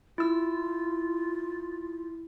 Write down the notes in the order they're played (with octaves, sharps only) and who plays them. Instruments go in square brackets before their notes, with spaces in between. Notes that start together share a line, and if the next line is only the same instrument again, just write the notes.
[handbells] E4 E6 [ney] F4